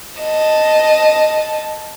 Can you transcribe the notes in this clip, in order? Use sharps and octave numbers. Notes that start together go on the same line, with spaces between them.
D#5 A5